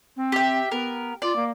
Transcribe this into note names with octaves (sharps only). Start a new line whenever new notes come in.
C4
G4 E5
B3 A#4
F4 D5
A#3